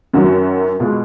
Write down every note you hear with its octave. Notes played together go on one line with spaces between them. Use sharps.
F#2 D#3 F#3 F#4
B2 G#3 F4